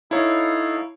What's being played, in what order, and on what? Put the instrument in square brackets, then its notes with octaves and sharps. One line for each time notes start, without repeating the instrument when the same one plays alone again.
[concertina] D#4 A4 F5 [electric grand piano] E4 C#5